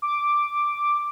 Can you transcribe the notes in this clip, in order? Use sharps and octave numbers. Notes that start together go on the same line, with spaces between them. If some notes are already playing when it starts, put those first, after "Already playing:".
D6